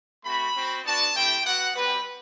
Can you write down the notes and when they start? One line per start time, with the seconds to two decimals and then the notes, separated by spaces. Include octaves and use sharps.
0.24 A3 C4 F#4 B5
0.55 C4 F#4
0.85 B3 D4 F#4 A5
1.15 A3 C4 E4 G4 G5
1.45 B3 F#4 F#5
1.75 G3 C4 G4 B4